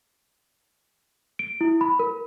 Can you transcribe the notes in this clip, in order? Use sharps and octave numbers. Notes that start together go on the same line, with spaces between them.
D7
E4
B5
A#4